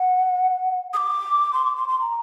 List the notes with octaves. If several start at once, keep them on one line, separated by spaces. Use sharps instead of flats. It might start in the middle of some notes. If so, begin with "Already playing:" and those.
Already playing: F#5
D#6
D6
C6
D6
C6
C6
A#5